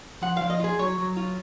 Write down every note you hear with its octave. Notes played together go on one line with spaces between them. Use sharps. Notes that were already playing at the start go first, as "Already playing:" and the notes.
F3 F#5
F3 F5
D#5
F4 G#4
F#3 C#5
F#3
F4